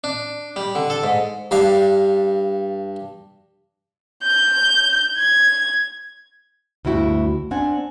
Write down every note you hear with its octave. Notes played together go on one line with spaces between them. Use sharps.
D4
G3
D3
A4
G#2
G2 F5
G6
G#6
D2 G2 E4 F#4 G5
C4 D4 F#5 G#5